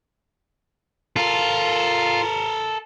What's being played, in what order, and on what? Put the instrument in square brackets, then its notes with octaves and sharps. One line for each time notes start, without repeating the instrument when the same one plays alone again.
[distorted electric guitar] F4 [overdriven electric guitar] A4 A#4